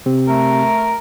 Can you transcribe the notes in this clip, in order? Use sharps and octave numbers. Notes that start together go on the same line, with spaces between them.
C3 C4 G4
A3 A#4